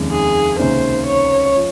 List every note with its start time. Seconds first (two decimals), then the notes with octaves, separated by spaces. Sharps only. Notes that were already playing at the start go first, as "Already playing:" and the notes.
Already playing: F1 D#2 D#3 G#3 C#4
0.11 G#4
0.59 C#2 C3 D#3 A#3 C#4 C5
1.07 C#5
1.56 F3